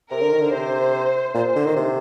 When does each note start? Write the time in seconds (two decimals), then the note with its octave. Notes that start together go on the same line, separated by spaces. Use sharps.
0.11 C3 A#4
0.21 D3
0.32 D#3
0.41 D3
0.51 C3 C5
1.34 A#2 C5
1.55 D3
1.65 D#3
1.76 C3